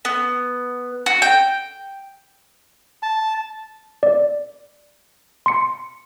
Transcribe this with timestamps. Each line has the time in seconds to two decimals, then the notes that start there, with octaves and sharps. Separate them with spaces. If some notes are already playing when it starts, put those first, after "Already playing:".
0.05 B3
1.06 F#4
1.22 G5
3.03 A5
4.03 D5
5.46 C6 C#7